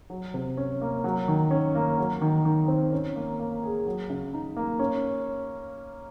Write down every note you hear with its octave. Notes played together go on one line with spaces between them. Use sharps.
F#3
C3
C#4
A#3
F#3
D#3
C#4
A#3
F#3
D#3
D#3
C4
C#4
A#3
A#3
G#4
F#3
C#3
D#4
A#3
C#4